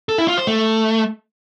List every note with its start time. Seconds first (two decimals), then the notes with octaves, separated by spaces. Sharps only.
0.09 A4
0.18 E4
0.28 F4
0.38 C5
0.47 A3